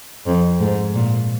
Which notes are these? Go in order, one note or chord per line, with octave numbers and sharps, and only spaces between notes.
F2
G#2
A#2